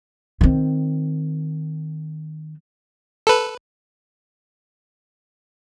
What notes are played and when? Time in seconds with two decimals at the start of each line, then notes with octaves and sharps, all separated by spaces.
0.41 D#3 C4
3.27 A4 B4